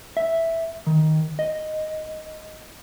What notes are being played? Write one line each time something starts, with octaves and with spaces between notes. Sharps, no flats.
E5
D#3
D#5